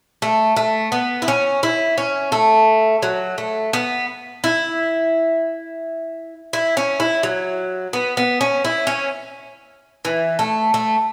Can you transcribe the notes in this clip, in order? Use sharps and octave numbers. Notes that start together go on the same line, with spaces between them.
A3
A3
B3
E4
C#4
E4
C#4
A3
F#3
A3
B3
E4
E4
C#4
E4
F#3
B3
B3
C#4
E4
C#4
E3
A3
A3